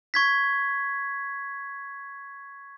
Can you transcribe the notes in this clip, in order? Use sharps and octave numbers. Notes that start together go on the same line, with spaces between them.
C#6 G#6 B6